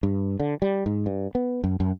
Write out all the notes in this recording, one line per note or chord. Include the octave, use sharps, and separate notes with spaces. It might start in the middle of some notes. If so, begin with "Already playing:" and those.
G2
D3
G3
G#2
G2
B3
F#2
F#2